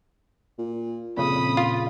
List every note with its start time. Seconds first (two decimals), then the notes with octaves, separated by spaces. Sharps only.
0.58 A#2
1.17 F2 A#2 C#3 B5 D#6
1.57 F4